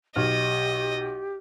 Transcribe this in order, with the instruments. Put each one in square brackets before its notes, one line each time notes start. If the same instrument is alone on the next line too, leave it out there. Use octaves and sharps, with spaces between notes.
[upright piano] B1 F6 [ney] G4 [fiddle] D#5